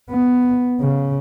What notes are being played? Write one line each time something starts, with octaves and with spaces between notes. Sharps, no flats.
B3
C#3